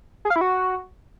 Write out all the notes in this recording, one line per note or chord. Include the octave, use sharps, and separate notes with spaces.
G#4
F5
E4
F#4